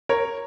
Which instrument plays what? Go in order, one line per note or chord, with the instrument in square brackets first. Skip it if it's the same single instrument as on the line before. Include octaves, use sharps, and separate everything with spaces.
[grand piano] A#4 C#5